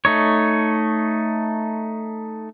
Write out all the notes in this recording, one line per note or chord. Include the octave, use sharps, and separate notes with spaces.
A3 D#4 C#5